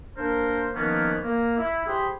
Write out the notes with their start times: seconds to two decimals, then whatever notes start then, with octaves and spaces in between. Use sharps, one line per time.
0.18 A#3 D4 A#4 C5
0.76 D#3 F3 A#3 B3 C#4
1.23 A#3
1.58 E4
1.87 G4 G#4 C5 B5